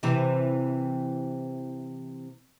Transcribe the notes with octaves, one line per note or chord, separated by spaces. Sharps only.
C3 E3